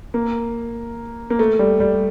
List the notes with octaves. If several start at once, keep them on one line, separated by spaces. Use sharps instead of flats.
A#3
A#3
A3
G3
G3